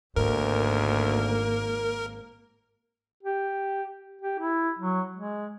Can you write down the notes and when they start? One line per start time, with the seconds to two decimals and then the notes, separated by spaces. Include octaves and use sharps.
0.16 G#1 D2 G#2 A#3 A#4
3.23 G4
4.21 G4
4.39 E4
4.79 F#3
5.16 G#3